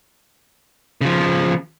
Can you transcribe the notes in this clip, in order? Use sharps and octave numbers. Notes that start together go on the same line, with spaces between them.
C#3 F3